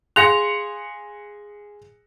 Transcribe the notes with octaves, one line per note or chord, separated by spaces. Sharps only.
G#4 F5 C6 F#6 A#6 C#7 F7